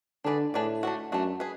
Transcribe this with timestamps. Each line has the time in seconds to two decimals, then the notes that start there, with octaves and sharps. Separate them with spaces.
0.24 D3 D4 G#4 B4 D5
0.54 A2 D4 G#4 B4 D5
0.83 A3 D4 F#4
1.12 F#2 A3 D4 F#4
1.40 G#4 B4